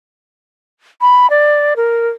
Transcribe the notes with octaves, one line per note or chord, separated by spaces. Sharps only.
B5
D5
A#4